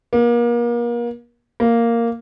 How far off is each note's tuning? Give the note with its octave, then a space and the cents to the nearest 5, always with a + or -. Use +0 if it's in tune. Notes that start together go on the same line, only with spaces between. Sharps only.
A#3 +35
A#3 -5